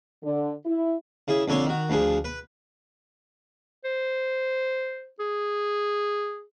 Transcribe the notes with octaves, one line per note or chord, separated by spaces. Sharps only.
D3
E4
C#3 E4 G#4
F2 D3 A4 C#5 D5 C6
D#3 F#4
D2 F3 D4 G#4
B4
C5
G#4